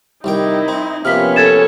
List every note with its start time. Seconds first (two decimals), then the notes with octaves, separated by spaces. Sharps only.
0.24 C2 D#3 D#4 E4 G5
0.68 C4
1.05 C3 F3 A#3 B3 C#4 F6 B6
1.36 A4 C#5 G#6 A6 E7